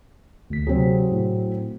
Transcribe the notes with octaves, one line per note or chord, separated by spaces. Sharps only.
D2 B6
C3 F#3 C4 G#4
A2